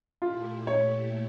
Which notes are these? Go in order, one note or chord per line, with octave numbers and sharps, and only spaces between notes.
A#2 A3 E4 F4 G4
C#5